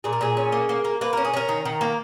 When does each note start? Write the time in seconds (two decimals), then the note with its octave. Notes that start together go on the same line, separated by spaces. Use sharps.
0.04 A#2 G#4
0.13 A#4
0.21 A#2 G#4
0.37 C#4
0.52 A#3
0.69 A#3
0.84 A#3
1.01 A#3 B4
1.13 C#4 A#4
1.25 G#4
1.34 C#4 A#4
1.49 D#3
1.65 D#3
1.81 A#3